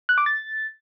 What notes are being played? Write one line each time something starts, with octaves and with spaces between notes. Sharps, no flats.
F#6
D6
A6